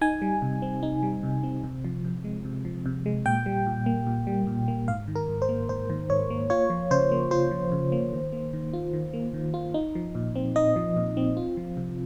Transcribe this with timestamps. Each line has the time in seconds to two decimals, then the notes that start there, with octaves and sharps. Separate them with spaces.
0.01 D#4 G#5
0.22 G3
0.42 C3
0.62 C4
0.83 D#4
1.03 G3
1.23 C3
1.43 C4
1.64 C3
1.85 F3
2.04 C3
2.24 G#3
2.45 C3
2.65 F3
2.86 C3
3.06 G#3
3.26 A#2 G5
3.46 G3
3.67 A#2
3.86 A#3
4.07 A#2
4.27 G3
4.47 A#2
4.68 A#3
4.88 G#2 F5
5.08 D#3
5.16 A#4
5.28 G#2
5.42 C5
5.49 A#3
5.69 G#2 C5
5.90 D#3
6.10 G#2 C#5
6.30 A#3
6.50 F4 C#5
6.70 F3
6.91 C#3 C5
7.12 A#3
7.31 F4 C5
7.51 F3
7.72 C#3
7.92 A#3
8.13 D#3
8.33 A#3
8.53 D#3
8.73 F4
8.93 D#3
9.14 A#3
9.34 D#3
9.54 F4
9.74 D#4
9.95 F3
10.15 A#2
10.35 C4
10.56 D#4 D#5
10.76 F3
10.96 A#2
11.17 C4
11.37 F4
11.57 F3
11.77 C3